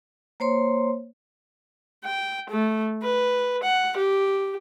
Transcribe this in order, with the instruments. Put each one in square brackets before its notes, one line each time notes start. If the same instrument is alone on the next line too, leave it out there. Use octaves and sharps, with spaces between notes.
[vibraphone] A#3 C5 C#5 C6
[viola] G5
A3
B4
F#5
G4